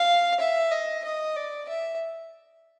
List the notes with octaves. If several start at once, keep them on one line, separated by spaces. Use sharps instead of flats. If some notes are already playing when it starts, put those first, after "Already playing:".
Already playing: F5
E5
D#5
D#5
D5
E5